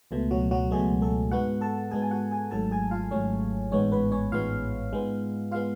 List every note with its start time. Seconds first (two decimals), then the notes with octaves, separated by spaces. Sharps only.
0.11 C#2 B2 A3
0.31 F#3 F#4
0.51 F#3 F#4
0.71 C#2 B2 G#3 A3 G#4
1.02 A3 A4
1.31 G#2 G#3 B3 F#4 F#5
1.61 A4 A5
1.91 G#2 G#3 B3 G#4 G#5
2.02 G#5
2.11 F#4 F#5
2.31 G#4 G#5
2.51 G#1 G#2 F#3 A3 A4 A5
2.71 G#4 G#5
2.91 F4 F5
3.11 G#1 G#2 F#3 A3 C#4 C#5
3.72 A1 G#2 G#3 B3 C#4 C#5
3.91 B3 B4
4.12 C#4 C#5
4.32 A1 G#2 G#3 B3 F4 F5
4.92 G#2 G#3 B3
5.51 G#3 B3 F4 F5